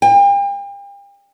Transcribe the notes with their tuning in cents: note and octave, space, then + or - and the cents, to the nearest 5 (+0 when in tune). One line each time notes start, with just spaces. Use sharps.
G5 +40